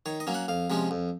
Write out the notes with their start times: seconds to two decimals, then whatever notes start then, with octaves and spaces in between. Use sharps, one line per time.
0.06 D#3 C#5
0.20 D#5
0.27 F#3 A#3 C#4
0.34 F#5
0.48 F2 F5
0.70 C3 F3 G#3 C#4
0.91 F2